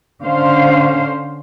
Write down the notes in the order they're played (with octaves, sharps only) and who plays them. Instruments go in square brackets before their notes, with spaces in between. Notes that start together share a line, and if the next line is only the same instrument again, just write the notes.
[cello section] D3 C#4 C5 F5